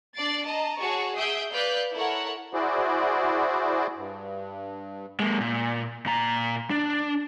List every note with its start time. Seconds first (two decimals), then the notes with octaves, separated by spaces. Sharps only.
0.15 D4 D5 A6 C7 D7
0.45 D#5 A5 A#5
0.79 F#4 G#4 C#5 A5 C#6
1.16 G#4 E5 D#6 G6 C7 D7
1.52 B4 D5 F5 F#6 G6 B6
1.94 E4 A4 A#4 C#5 F#5
2.54 E4 F#4 G#4 C5 D5
3.96 G2
5.20 G#3 A#3
5.41 A#2
6.06 A#2 A#5
6.70 D4